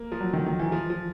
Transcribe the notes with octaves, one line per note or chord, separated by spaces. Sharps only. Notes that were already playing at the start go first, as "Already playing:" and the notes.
Already playing: A#3
F3
F#3
D#3
D#3
E3
F3
F3